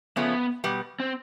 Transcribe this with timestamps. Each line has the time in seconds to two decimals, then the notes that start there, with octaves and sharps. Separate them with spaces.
0.16 C#3 F3 A3 B3 C#4
0.64 B2 G3 B3
1.00 C4